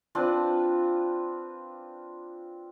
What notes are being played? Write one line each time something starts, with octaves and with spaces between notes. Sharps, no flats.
C4 D4 F4 B4